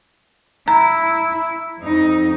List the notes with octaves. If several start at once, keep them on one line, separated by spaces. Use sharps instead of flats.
E4 A#5
F2 D#4